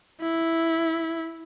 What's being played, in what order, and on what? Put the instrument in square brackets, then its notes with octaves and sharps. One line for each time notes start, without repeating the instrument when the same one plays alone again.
[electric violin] E4